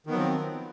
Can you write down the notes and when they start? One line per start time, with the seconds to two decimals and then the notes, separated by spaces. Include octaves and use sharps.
0.07 D#3
0.10 B3
0.12 F#3
0.15 F3
0.18 C4